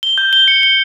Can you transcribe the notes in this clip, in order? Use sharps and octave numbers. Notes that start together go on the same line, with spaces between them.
G7
G6
G7
C#7
G7